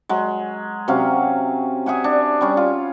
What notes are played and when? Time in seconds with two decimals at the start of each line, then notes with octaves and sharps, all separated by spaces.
0.09 F#3 G#3
0.88 C3 F#3 C#4 F5
1.86 G#4 E5 F#5 G#5
2.04 D4
2.41 G3 C#4
2.57 F4